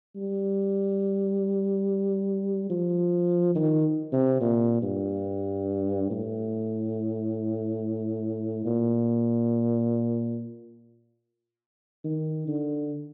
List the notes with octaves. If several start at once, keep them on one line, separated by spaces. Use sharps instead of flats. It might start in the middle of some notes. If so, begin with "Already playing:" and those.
G3
F3
D#3
C3
A#2
G2
A2
A#2
D#3
D3